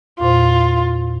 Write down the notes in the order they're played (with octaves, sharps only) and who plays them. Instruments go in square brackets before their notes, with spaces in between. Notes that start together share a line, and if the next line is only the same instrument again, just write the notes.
[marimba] E2 A#2 C5 [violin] F4